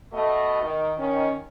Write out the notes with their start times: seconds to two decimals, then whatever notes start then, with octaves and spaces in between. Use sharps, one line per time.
0.12 B2 A3 D#5
0.62 D#3
0.97 D#3 C#4